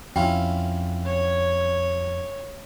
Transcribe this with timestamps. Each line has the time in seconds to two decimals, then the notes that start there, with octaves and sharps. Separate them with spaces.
0.16 F2 C#4 E4 F4 G5
1.06 C#5